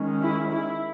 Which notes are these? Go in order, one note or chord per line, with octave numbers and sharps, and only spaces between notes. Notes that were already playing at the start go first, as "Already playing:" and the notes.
Already playing: D#3 G#3 C#4
E4
E4